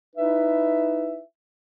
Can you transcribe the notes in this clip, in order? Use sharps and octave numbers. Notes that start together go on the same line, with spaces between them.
D#4 E4 B4 E5